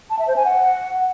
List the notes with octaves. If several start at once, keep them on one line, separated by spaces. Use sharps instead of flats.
A5
E5
C5
G#5
F#5